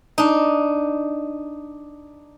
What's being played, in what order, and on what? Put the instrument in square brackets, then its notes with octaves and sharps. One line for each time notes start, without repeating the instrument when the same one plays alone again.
[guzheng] D4 D#4